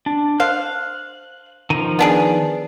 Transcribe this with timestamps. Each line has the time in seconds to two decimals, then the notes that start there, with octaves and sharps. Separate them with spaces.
0.06 D4
0.40 C5 F5 F#6
1.70 D#3 F3
1.99 B3 D4 G#4